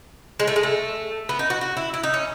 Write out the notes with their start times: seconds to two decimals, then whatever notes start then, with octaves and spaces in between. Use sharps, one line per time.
0.40 G#3
0.48 A3
0.56 G#3
0.63 A3
1.29 B3
1.39 D#4
1.50 F#4
1.61 F#4
1.77 E4
1.94 E4
2.03 D#4
2.14 C#4